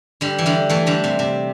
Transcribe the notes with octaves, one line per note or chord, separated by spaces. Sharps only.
D3 G3
E3
D3 G3
E3 A3
D3 G3
C3
C3